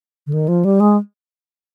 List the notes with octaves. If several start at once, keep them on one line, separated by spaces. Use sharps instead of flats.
D3
D#3
F3
G3
G#3